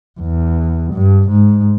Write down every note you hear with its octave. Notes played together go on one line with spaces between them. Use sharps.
E2
G2
G#2